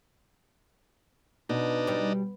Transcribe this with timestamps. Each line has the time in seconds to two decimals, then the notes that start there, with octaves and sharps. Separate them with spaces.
1.49 B2 D4 D#4
1.87 G3 D5